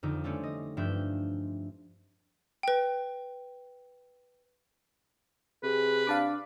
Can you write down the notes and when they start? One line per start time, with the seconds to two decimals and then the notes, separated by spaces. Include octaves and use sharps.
0.03 F2 D3 D#4
0.24 G3 A3 C4 C#4
0.43 D#5
0.77 G2 F3 D4 E5 G6
2.63 B4 G5
5.63 C3 G#4 B4
6.07 D4 F5 A5 D6